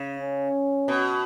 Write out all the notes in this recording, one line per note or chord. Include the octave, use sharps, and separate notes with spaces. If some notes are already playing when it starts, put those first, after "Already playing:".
Already playing: C#3
C#4
B2